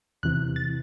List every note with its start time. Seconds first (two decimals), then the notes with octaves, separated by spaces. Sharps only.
0.23 E2 C3 E3 F#6
0.56 A6